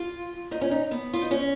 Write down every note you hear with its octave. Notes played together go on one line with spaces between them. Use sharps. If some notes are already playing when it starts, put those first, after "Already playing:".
Already playing: F4
D#4
C#4
D#4
B3
F4
D#4
C#4